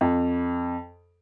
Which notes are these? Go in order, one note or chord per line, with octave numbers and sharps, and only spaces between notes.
F2